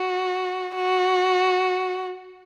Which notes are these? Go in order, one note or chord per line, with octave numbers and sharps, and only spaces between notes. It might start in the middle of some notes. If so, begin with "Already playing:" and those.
Already playing: F#4
F#4